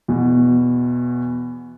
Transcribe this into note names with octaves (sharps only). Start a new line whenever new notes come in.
E2 B2